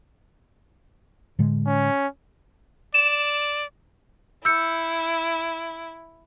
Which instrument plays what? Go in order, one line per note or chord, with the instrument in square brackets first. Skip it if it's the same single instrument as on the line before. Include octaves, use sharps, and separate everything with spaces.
[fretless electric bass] A2 D3 G#3
[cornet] C#4
[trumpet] D5 [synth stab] E7
[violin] E4 [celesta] E6 G6 C#7